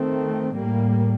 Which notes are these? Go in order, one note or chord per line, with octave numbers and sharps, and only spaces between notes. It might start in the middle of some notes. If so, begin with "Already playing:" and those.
Already playing: D#3 A3 C4
A2 G3 A#3